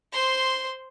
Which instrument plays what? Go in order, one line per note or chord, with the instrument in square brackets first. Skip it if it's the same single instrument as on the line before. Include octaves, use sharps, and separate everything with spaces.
[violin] C5 C6